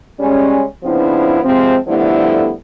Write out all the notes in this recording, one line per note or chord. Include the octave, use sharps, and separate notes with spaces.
C#3 G3 G#3 C#4
C#3 F3 B3 C4 D4 E4
C3 F3 G#3 C4
D3 F3 G3 A3 B3 E4